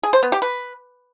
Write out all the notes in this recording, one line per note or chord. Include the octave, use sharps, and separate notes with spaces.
G#4
C5
B3
G4
B4